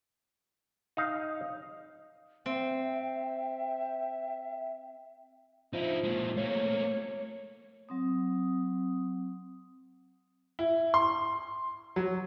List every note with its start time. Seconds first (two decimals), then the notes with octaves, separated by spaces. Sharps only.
0.97 D#4 F5
2.46 C4 E5 G5
5.73 F3 D#4 E4
6.04 A#2 G#3
6.37 A3 A#3 C#5
7.89 F#3 C4 D#6
10.59 E4
10.94 C6
11.96 F#3